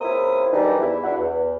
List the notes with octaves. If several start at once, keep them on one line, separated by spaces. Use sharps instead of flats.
C#2 A#3 C4 E4 A#4 D#6
G#2 D#3 E3 G3 D4 D#4
E2 E4
D4 E4 F#4 E5 F#5
E2